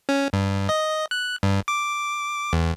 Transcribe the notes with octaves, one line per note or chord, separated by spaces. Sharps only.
C#4
G2
D#5
F#6
G2
D6
E2